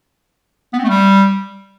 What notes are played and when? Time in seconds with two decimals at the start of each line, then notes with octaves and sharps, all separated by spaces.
0.73 B3
0.79 C4
0.84 A3
0.89 G3